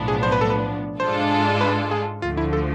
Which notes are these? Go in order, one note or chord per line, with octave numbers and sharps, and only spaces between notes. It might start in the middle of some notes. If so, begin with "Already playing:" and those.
Already playing: B1 A2 F3 B3 D4
G#4
C5
B4
A4
B4
G#2 G#3 D4 F4 A4 C5
B4
G#4
D2 D3 F3 A3 F4
E4
A4